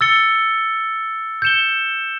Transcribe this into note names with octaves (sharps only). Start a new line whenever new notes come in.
E6 A6 C#7 G7
G6 C#7 E7 G7